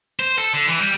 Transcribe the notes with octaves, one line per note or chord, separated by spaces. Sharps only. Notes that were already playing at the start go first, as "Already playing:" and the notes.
C5
A4
D3
E3
G3